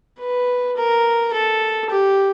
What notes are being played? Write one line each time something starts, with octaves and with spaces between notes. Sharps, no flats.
B4
A#4
A4
G4